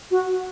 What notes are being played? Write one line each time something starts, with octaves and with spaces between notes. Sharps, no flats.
F#4